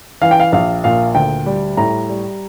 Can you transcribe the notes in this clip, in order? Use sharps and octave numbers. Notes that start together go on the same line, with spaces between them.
E3 F5
G5
F5
A#1 F5
A#2 F5
D2 G5
G3
A2 A#5
G3